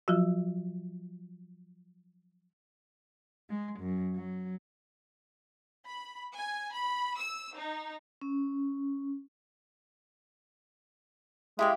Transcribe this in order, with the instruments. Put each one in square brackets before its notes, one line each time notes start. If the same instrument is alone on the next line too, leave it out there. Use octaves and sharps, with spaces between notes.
[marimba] F3 F#3 F4 F#4
[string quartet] G#3
F#2
F#3
[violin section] B5
G#5
B5
E6
D#4
[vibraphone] C#4
[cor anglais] G#3 [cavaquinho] E4 G4 F5